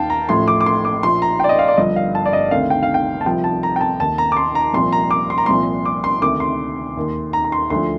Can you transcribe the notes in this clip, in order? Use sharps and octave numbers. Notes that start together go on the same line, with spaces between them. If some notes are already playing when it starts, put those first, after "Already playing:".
Already playing: D#2 D#3 F5 G5 A5
A#5
A1 A2 F3 C6
D6
D6
C6
D6
A#1 A#2 F3 C6
A#5
G5
D5
D#5
F5
D5
G1 G2 F3 D#5
F5
A5
D5
D#5
D2 C3 D#3 F5
G5
F5
G5
A5
C2 C3 F3 G5
A5
A#5
G5
A5
D#2 D#3 A5
A#5
D6
C6
A#5
C2 A#2 F3 C6
A#5
D6
C6
A#5
C2 A#2 F3 C6
D6
C6
D2 C3 D#3 D6
C6
D#2 D#3
A#5
A#5
C6
D2 D3 F3 C6